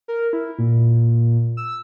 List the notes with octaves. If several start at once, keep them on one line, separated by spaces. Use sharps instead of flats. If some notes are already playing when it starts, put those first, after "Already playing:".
A#4
E4
A#2
E6